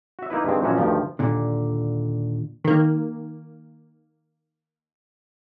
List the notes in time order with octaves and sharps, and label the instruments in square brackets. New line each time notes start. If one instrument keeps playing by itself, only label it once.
[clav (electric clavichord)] F#4 E5
A#3 D#4 E4 B4
G2 D#3 G#3 C4
F#2 A#2 E3 F3 C#4 F#4
D2 G2 D#3 F3
[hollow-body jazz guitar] D#2 A#2 D3
[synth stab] D#3 A#3